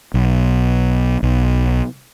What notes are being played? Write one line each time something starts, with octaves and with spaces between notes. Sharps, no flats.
B1
B1